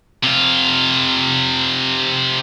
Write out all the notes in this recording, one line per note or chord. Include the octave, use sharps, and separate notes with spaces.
C3 F4